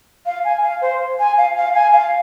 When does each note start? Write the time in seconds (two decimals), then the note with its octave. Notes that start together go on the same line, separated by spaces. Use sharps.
0.26 F5
0.45 G#5
0.63 F5
0.82 C5
1.19 G#5
1.38 F5
1.57 F5
1.75 G#5
1.93 F5